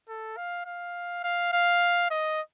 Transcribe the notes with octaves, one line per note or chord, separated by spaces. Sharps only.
A4
F5
F5
F5
F5
D#5